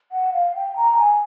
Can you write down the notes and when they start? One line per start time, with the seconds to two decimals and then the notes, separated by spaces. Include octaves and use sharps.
0.12 F#5
0.33 F5
0.55 G5
0.76 A#5
0.97 G#5